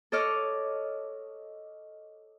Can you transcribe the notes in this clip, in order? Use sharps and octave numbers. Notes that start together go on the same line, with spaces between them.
A4 C#5 D#5 D6 F6